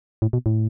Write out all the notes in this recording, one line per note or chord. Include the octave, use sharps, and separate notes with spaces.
A2
B2
A2